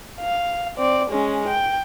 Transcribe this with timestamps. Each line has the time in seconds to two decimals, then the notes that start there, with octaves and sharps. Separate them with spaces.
0.20 F5
0.78 C4 D5
1.11 G#3 C#4
1.49 G5